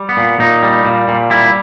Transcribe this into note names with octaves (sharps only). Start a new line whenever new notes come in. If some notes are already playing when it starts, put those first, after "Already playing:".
Already playing: G3
B3
A#2
A#2 D#4
G3
A#2
A#2
G3 E4